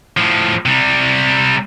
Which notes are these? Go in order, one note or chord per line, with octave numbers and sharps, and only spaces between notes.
A2 F3
C3 G3